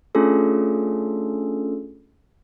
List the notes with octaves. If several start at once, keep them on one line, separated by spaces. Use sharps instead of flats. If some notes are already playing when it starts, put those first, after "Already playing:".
A3 C#4 D4 F4 G#4 A4